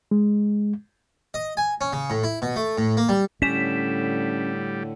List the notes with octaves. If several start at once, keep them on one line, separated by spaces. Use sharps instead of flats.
G#3
D#5
G#5
C#4
C#3
A2
E4
B2
A3
A2
A#3
G3
A2 D3 G3 C#4 B6 E7